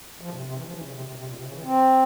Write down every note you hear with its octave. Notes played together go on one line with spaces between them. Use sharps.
F3
A#2
C3
C3
E3
F3
E3
C#3
C3
C3
C3
A#2
C3
C#3
E3
C4